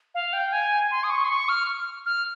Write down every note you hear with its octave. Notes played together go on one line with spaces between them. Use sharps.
F5
G5
G#5
C6
D#6
C#6
C6
C#6
F6
F6